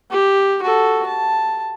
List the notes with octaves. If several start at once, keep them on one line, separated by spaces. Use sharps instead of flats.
G4
F#4 A4
A5